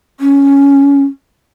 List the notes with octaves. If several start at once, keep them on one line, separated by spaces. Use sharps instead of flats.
C#4